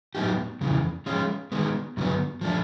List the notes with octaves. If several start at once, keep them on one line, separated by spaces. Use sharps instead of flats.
A2 F#3 B3 D#4 G4
F2 C#3 E3
F3 G#3 C#4 F4
D#3 G#3 B3
G2 D3 F#3 B3
F3 A3 D4